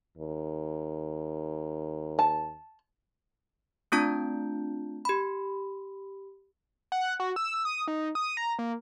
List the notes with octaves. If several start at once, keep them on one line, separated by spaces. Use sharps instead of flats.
D#2
A5
A3 C4 D4 F4 A5 G6
G4 B5
F#5
F#4
E6
D#6
D#4
D#6
A#5
A#3